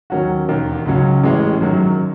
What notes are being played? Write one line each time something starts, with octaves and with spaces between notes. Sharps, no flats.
D#2 D#3 F#3 C#4 F#4
E1 D#2 D#3
C#2 C#3 F#3 C#4
A1 A2 E3 G#3 C#4
F#2 D#3 F#3